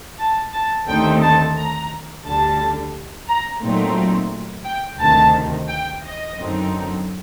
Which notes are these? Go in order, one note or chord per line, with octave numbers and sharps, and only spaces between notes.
A5
A5
D#2 D3 A3 C4 D#4 G5
A5
A#5
D2 D3 G3 A5
A#5
A#2 F#3 A3 C4 D#4
G5
D2 C3 D#3 A5
G5
D#5
F#2 D3 F#3 C4 D#4